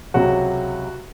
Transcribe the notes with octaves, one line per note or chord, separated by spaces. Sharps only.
C#2 C3 F#3 F#4